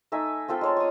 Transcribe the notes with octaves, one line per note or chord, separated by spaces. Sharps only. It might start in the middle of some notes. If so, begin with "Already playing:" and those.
A3 D#4 E5 G#5
C4 F4 A4 G5
G#3 C#5 A5
C#6 D#6